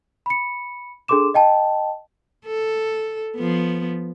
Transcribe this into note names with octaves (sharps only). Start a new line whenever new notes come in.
B5 C#7
D4 G#4 A4 C6 D6 E7
D#5 G5 A5
A4
F3 B3